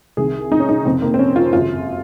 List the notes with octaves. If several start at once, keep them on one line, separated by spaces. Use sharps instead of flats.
C2 C3 D#3 G#4
D#4
C#4
D#4
F1 F2 C#3 C4
A#3
C4
C#4
F4
G#1 F#2 C#3 F4